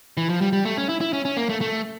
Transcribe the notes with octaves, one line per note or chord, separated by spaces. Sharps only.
E3
F3
G3
G3
A3
C#4
E4
E4
C#4
C#4
A#3
A3
A3